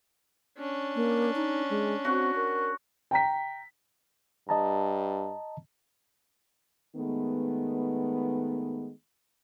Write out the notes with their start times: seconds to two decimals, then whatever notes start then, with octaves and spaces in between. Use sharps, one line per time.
0.58 C#4 D4
0.96 A#3
1.35 D#4
1.70 G#3
2.05 C4 F#4 F#5
2.36 A#4
3.11 G5 A#5 B6
4.49 G2 D#5 A5 A#5
6.96 D#3 G#3 A3 B3